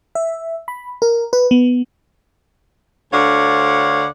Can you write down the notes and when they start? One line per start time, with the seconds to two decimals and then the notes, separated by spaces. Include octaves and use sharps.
0.15 E5
0.68 B5
1.02 A#4
1.33 B4
1.51 B3
3.13 D2 D3 C#5 D5 F5 F#5